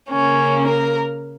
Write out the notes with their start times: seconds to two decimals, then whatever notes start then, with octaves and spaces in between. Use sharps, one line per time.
0.11 C#3 A#3 C#4
0.68 A#4